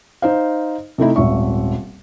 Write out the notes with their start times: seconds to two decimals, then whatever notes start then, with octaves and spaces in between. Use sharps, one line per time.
0.22 D#4 C5 F5
0.98 C3 A3 D#4 E4
1.16 D#1 G#1 E5 C#6